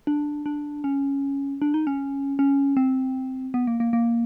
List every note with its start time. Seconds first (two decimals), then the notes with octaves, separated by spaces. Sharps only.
0.07 D4
0.46 D4
0.84 C#4
1.62 D4
1.74 D#4
1.87 C#4
2.39 C#4
2.77 C4
3.54 B3
3.67 A#3
3.80 A#3
3.93 A#3